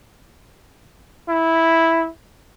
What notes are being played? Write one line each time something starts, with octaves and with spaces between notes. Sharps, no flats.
E4